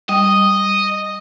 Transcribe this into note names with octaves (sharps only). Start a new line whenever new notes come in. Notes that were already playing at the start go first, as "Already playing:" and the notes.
G3 D#5 D#6